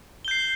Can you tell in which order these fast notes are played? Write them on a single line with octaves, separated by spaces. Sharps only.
G7 G6 C7